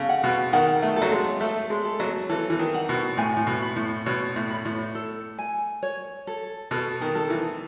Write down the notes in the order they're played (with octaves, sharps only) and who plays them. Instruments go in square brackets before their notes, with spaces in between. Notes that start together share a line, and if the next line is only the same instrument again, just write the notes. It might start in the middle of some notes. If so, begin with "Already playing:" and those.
Already playing: [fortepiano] C#3 [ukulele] A4
[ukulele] F#5
[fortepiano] B2
[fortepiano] D#3 [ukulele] F#5
[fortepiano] A3
[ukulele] A4
[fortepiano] F#3
G#3
[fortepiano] A3 [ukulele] A4
[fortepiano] G#3
[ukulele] A4
[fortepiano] F#3
[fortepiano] E3 [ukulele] A4
[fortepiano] E3
D#3
[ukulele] F#5
[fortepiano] B2
[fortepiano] A2 [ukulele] G#5
[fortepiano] A2
B2
[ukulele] B5
[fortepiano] A2
[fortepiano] B2 [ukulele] C#5
[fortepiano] A2
[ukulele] B5
[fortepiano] A2
[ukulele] A4
G#5
C#5
A4
[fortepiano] B2 [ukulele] A4
[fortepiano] D#3
[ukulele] A4
[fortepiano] E3